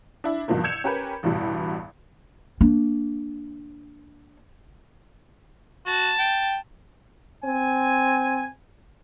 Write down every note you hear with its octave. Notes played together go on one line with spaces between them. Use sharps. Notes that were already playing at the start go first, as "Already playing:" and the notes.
D4 E4
E2 G2 B2 D#3 F3 A#3
E6 G6 G#6 C#7 E7 F7
C#4 G4 A#4 B4
A1 E2 G2 B2 G3
A#3 D4
F#4 A5
G5
C4 G#5